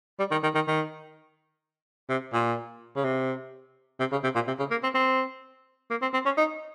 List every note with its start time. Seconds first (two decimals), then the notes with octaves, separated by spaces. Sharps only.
0.19 G3
0.31 D#3
0.43 D#3
0.55 D#3
0.67 D#3
2.09 C3
2.33 A#2
2.96 C#3
3.04 C3
4.00 C3
4.12 C#3
4.23 C3
4.35 A#2
4.47 C3
4.59 C#3
4.71 A#3
4.83 C4
4.94 C4
5.90 A#3
6.02 C4
6.14 C4
6.26 C#4
6.37 D#4